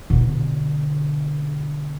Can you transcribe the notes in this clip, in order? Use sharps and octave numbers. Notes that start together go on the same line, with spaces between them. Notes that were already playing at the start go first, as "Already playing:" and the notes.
B2 D3